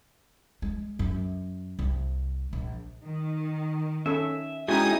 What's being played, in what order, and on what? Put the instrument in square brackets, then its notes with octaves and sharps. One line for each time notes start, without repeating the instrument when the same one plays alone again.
[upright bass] G#3
F#2
C2
A#1
[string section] D#3
[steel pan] C#4 A4 [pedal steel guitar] E5
[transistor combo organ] G#3 E4 [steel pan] C#4 F#4 [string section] D#4 D#6 [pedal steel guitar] G4 G#5